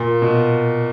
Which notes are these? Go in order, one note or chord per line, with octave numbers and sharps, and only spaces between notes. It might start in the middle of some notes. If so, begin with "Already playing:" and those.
Already playing: A#2
B2